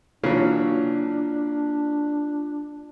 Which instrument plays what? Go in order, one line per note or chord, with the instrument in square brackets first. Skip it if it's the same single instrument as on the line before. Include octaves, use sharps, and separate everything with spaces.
[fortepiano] C#3 E3 F#3 [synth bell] A#3 F4 [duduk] D4